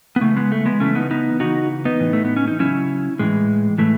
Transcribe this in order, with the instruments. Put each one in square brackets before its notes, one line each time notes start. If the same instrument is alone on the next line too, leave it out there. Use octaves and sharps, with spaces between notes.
[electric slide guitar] B3
C#3 E3 A3
G#3 B3
A3
G#3 B3
C#3 E3 A3 C#4
B3 D#4
B3 D#4
C#3 E3 D#4 F#4
B3 D#4
A2 E3
A3
B3
C#4
D#4
C#3 F#3 C#4 E4
A2 E3 G#3
A2 E3 A3